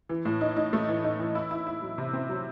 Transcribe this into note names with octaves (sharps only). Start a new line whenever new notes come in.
E3
A2
D#4
D#4
A3
E3
D#4
E3
E4
E4
E4
F#3
C3
C4
F#3